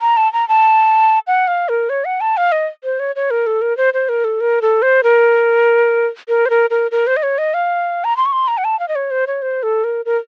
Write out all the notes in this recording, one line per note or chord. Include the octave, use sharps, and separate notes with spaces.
A#5
A5
A#5
A5
F#5
F5
A#4
C#5
F#5
A5
F5
D#5
C5
C#5
C#5
A#4
A4
A#4
C5
C5
A#4
A4
A#4
A4
C5
A#4
A#4
C5
A#4
A#4
A#4
C5
D#5
C#5
D#5
F5
A#5
C6
C#6
C6
A#5
F#5
A5
F5
D#5
C#5
C5
C#5
C5
A4
A#4
A#4